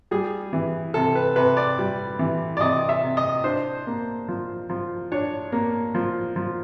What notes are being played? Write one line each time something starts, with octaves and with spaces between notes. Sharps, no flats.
G3 G#4
E3
C3 A4
B4
C3 B4
D5
G3
E3
D5
C3 D#5
E5
C3
D#5
D4 C5
A#3
F3
F3
D4 C#5
A#3
F3
F3